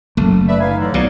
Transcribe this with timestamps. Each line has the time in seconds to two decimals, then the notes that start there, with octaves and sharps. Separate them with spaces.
0.17 F#1 F#3 A3
0.48 B4 D5 E5
0.60 D#4 F5 G#5
0.77 A2 D3 E3
0.94 B1 B2 D#4 C#5 D5